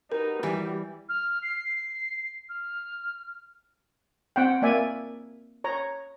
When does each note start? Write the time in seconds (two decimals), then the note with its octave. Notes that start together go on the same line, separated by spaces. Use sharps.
0.12 D#4 F#4 G4 A#4 B4
0.43 E3 G3
1.09 F6
1.42 C7
2.49 F6
4.36 C4 F#5 G5
4.62 A#3 D5 E5 G#5
5.64 C#5 A#5